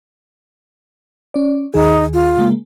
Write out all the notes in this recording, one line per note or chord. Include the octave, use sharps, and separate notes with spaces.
C#4 D5
D#2 D#3 D#4 G#4
F4
C#3 G#3 A#3